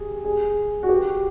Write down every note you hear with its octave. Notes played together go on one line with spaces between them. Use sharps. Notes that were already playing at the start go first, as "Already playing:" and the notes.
Already playing: G4 G#4
G#4
F#4
G4